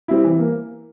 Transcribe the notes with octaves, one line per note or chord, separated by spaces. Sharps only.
G3 C4 E4
E3
A#3